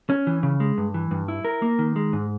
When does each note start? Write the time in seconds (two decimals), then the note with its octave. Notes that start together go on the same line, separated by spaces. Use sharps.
0.10 C#4
0.27 E3
0.43 C#3
0.60 G#3
0.78 G2
0.94 E3
1.11 G2
1.28 E4
1.45 A#4
1.62 A#3
1.79 D#3
1.96 G#3
2.13 G#2